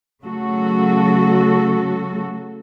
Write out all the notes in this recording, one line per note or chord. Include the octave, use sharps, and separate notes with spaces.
C#3 F#3 A3 F#4 A4